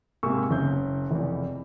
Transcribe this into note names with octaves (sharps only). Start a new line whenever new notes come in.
G#2 C3 A#3 G#5 C#6 E6
F#1 C#4 G6
F1 E2